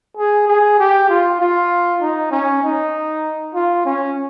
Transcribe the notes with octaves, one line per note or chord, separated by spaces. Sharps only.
G#4
G#4
G4
F4
F4
D#4
C#4
D#4
F4
C#4